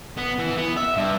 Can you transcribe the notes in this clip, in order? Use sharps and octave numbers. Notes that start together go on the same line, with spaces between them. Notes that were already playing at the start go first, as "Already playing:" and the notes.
B3
E3
B3
E5
G2